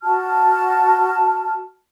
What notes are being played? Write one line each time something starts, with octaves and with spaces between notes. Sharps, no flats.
F#4 A5 F6